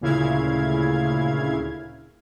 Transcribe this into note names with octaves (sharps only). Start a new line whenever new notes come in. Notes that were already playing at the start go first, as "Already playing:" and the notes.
D2 A#2 C#3 E4 F5 G#6